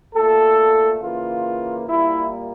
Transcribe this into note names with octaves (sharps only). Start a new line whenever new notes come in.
A#2 A3 A4
C#3 E3 A#3 F4
A#2 G3 A#3 E4